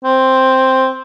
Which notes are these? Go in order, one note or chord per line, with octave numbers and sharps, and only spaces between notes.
C4